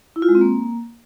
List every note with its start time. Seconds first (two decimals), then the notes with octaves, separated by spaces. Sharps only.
0.16 E4
0.22 F4
0.29 G#3
0.35 C4
0.41 A#3